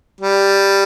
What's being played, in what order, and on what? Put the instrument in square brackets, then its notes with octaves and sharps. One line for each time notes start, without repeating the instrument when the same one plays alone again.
[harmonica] G3